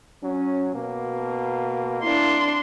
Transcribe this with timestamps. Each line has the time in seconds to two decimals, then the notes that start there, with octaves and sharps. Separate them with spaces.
0.23 F#3 C#4
0.75 B2 A#3
2.03 D4 E4 C6